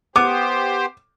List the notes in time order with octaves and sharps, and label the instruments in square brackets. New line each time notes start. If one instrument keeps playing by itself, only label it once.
[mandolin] B3 [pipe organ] G4 C5 [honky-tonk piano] D6